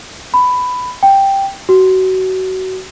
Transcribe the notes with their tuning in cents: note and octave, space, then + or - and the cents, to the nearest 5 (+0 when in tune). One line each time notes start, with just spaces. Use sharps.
B5 +15
G5 +0
F#4 +25